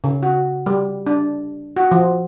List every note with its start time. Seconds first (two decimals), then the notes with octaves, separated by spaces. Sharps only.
0.04 C#3
0.23 F#4
0.66 G3
1.07 D4
1.76 F#4
1.91 F3